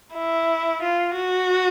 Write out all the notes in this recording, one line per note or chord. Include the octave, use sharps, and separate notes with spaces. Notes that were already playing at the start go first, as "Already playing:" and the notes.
E4
F4
F#4